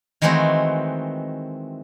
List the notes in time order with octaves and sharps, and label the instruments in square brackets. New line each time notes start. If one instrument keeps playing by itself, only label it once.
[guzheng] D#3 E3 G#3 A3 C4 F#4